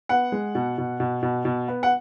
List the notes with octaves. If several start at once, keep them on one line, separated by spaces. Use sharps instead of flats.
B3 F#5
G#3
B2
B2
B2
B2
B2
B3
F#5